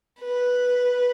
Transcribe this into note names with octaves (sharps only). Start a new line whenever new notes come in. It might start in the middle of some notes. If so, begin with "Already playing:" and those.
B4